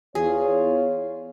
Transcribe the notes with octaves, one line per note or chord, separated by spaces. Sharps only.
E2 F4 G#4 C#5